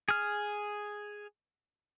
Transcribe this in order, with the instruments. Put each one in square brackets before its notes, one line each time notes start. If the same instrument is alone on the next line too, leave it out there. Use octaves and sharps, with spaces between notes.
[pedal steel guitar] G#4 F6